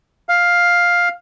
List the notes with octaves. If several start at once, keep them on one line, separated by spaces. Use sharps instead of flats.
F5